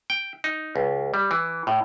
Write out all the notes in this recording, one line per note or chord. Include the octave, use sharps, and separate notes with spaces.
G5
D#4
C#2
G3
E3
A2